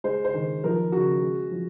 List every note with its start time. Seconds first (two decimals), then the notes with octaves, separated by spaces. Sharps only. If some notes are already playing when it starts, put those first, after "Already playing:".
0.04 G#3 C5
0.25 C5
0.34 D#3
0.63 F3 A#4
0.92 C#3 F#4
1.21 G#3
1.51 F3